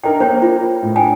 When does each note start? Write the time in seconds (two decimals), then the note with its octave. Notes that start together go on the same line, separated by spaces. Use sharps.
0.04 D4 D#4 A#4 G5
0.20 A#3 C5 C#5 G5
0.42 F4
0.82 A2
0.96 D4 G5 G#5